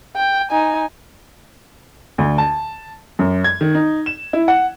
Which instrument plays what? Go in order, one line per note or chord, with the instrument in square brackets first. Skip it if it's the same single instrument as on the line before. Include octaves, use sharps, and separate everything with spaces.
[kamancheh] G5
D#4 G#5
[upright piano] D2
A5
F#2
G#6
D#3
D#4
E7
E4
F#5